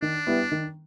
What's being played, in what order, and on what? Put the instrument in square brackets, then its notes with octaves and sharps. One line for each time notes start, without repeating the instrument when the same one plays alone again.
[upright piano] D#3 [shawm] D4
[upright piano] G3 B3 E4
D#3